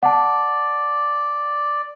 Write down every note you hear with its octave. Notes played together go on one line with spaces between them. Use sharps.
D5 F#5 A5